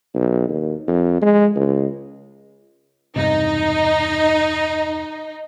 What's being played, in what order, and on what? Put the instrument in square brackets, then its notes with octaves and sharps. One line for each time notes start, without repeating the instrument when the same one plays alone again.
[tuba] B1
D#2
F2
G#3
C#2
[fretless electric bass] E1 G2 C3 [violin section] D#4